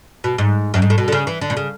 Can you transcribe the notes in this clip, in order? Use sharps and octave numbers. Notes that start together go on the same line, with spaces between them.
B2
G#2
F#2
G#2
A2
B2
D3
C#3
E3
D3
B2
C#3